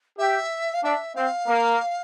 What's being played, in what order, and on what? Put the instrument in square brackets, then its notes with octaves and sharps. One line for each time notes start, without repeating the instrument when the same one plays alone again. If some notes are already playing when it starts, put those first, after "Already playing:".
[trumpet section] G4 [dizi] E5
[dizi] F5
[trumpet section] D4 [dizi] E5
[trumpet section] C4 [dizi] F5
[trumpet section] A#3